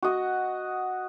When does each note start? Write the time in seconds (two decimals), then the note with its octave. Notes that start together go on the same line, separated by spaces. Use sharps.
0.02 F#4 D#5